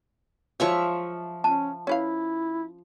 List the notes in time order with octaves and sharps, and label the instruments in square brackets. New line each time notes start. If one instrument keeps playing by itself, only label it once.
[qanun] F3 E5 C#6 [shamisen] F#3 G#3 D#4
[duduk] C#4 [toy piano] A5
[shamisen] C#4 B4 F5 [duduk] E4